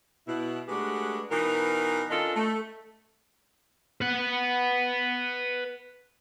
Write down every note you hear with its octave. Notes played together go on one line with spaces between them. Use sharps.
B2 E4
G#3 A3 D4 F#4 G4 B4
B2 E3 D#4 A#4
C#4 D4 F4 A4 A#4 D#5
A3
B4 F#5